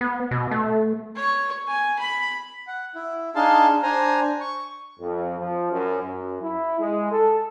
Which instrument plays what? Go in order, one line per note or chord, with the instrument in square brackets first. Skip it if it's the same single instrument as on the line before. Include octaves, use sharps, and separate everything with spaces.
[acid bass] B3
B2
A3
[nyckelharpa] C#5 C#6
G#5
B5
[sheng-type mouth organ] F#5
E4
D4 D#4 G#4 F5 A5 C6
D4 C5 G#5 A#5
C#6
[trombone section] F2
F3
F#2
F#2
E4
G#3
A4